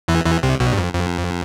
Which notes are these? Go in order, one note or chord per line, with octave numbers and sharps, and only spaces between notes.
E2 E3
E2 E3
C2 C3
B1 B2
G2
F2
F2